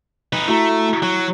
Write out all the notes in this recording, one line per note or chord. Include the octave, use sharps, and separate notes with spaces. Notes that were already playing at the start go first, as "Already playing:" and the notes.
D#4 B4
A3 E4 F#4 A#5
F#3